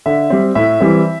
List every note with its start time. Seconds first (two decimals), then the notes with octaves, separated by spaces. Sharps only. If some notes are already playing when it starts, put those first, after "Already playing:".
0.06 D3 E5
0.30 G3 C4
0.55 A2 E5
0.80 E3 G3 C4 E4